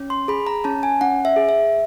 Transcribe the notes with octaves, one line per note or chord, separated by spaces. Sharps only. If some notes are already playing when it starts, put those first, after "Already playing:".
Already playing: C#4
C6
G#4 B5
A#5
C#4 A5
G#5
C#4 F#5
E5
G#4
E5